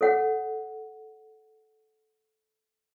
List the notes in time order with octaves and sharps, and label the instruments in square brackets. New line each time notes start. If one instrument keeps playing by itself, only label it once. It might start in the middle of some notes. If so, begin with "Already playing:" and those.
[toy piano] A4 C#5 F#5